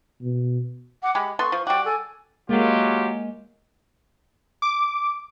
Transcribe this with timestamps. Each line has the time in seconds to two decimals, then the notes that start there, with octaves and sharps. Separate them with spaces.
0.22 B2
1.03 F#5 D6
1.15 G#3 G4 B5
1.39 B3 A4 C6 C#6
1.52 F3
1.67 G3 F#4 G5 D6
1.86 A4 G#5
2.49 F#3 G#3 A#3 F4 G4
4.62 D6